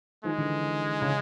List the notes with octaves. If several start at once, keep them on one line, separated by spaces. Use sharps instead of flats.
D#3 F3 G#3
D3 E3
C#3